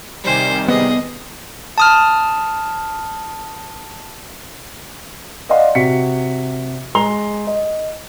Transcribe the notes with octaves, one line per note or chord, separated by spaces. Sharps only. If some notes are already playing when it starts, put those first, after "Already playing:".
C3 D#3 G3 C5 G#5
B3 G#4 D#5
A5 D#6 F6
D5 D#5 F5 F#5 C6
C3 F#4 B6 C#7
G#3 A#5 C6 F7 G7
D#5